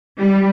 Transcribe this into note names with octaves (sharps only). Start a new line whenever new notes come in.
G3